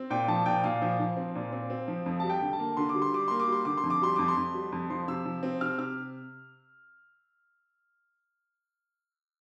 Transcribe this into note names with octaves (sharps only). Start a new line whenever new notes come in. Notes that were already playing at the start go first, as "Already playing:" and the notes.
Already playing: C4
A#2 G5
F3 A5
A#2 G5
A#2 F5
F3
F3
C4
A#2
C4
C4
F3
F2
G3 A5
G5
D3
A5
A#3
D3 C6
D6
G3
C6
G3 D6
A#3 C6
D6
G3 C6
D3 D6
C6
F2
D6
G3 C6
F2 D6
C6
F2
G3
F2
F3 C6
C3 E6
F3
C4
C3 F6
C3 F6